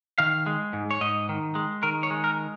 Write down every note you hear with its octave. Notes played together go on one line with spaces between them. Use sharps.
D#3 F5
G#3
G#2
C#5
G#2 D#5
D#3
G#3
D#3 A#4
C#5
G#3
A#4